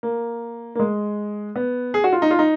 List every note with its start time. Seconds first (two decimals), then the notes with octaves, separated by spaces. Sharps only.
0.03 A#3
0.75 A#3
0.79 G#3
1.56 B3
1.94 G#4
2.04 F#4
2.13 F4
2.22 D#4
2.31 F4
2.39 D#4